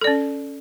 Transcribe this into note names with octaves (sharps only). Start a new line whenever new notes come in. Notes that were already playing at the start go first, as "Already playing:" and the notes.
C#4 A4 D5